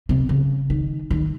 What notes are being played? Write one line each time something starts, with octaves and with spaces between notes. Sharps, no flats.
C3
C#3
D#3
D#3